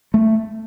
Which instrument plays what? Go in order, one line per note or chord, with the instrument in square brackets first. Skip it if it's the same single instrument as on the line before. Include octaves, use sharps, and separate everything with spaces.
[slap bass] A3